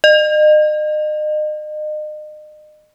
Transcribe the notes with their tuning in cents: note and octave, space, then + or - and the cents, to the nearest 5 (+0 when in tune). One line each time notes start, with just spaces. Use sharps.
D#5 -35